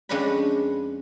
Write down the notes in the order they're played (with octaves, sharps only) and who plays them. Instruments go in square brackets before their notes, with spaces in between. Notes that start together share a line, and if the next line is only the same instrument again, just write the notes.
[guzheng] F2 G#3 C#4 D4 B4 B5